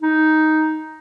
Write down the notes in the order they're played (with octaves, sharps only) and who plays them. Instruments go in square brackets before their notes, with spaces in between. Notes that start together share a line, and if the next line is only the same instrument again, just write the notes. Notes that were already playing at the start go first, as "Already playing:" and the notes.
[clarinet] D#4